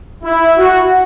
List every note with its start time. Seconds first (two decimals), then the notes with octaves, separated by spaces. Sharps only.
0.24 E4
0.58 F#4